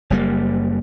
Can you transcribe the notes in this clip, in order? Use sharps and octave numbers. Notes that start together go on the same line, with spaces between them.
F#1 G3 A#3